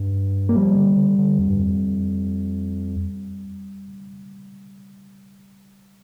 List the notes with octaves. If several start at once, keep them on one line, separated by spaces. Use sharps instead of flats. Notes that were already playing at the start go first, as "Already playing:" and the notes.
Already playing: G2
A#3
F3 G3
D3
D3
D3
F2
G2
F2